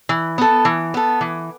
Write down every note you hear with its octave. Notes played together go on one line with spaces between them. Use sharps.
E3
B3 A4
E3
B3 A4
E3